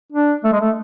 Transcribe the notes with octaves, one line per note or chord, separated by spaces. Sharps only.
D4
A3
G#3
A3